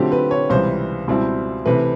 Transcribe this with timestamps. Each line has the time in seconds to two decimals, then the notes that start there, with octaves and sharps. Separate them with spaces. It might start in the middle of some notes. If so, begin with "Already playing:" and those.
Already playing: D3 F#3 A3 C4 F4 G4
0.12 B4
0.31 C#5
0.50 C#2 C3 E3 G3 C5
1.08 C#2 B2 G3 C4 E4
1.65 C3 E3 A3 B4